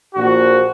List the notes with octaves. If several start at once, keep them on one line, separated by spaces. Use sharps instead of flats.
A#1 A#2 F3 F#4